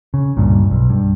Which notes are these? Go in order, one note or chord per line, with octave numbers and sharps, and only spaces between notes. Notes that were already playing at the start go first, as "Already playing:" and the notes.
C#3
C#2 G2 A#2
B1
G2